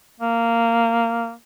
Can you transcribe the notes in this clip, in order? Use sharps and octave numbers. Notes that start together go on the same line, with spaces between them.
A#3